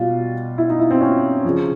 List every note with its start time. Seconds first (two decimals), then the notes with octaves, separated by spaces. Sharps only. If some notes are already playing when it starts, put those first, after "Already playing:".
Already playing: B2 G3 F4
0.58 E4
0.69 D#4
0.79 E4
0.91 C4
1.01 C#4
1.45 C#3 F3